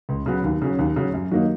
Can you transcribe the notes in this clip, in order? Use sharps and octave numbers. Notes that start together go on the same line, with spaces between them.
C#2
C#3 F#3 B3
D#2
C#3 F#3 C#4
D#2
C#3 F#3 C#4
F#2
D#3 F#3 A#3 D#4